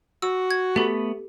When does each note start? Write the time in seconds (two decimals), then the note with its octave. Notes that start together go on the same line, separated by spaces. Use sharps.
0.22 F#4 E6
0.51 G#6
0.76 A3 B3 G4 A4 B5